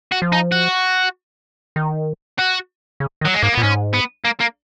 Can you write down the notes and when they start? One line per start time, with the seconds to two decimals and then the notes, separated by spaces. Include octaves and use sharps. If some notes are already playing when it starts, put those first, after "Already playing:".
0.12 F#4
0.22 F3
0.32 D#4
0.52 F#4
1.76 D#3
2.39 F#4
3.00 C#3
3.21 D#3
3.25 F#3
3.34 G#3
3.43 G#2 A#3
3.53 B3
3.57 A#2
3.63 G#2 C#4
3.94 B3
4.25 A#3
4.40 A#3